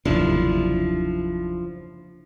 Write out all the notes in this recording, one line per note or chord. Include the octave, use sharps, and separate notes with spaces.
F#1 D#2 C3 F3 D4 E4